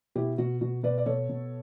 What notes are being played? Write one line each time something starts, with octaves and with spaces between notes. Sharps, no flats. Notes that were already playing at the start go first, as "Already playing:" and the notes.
B2 E4 G4
B2 F#4
B2 F#4
B2 B4 D5
D5
B2 A4 C#5
B2